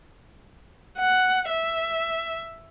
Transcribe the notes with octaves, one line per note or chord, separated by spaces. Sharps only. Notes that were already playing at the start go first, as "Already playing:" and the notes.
F#5
E5